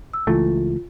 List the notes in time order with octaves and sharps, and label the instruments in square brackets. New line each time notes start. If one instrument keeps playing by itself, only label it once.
[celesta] E6
[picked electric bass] C#2 E3 A3 [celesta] F4